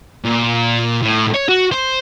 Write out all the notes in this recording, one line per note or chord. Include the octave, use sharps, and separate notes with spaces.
A#2
A2
C#5
F#4
C5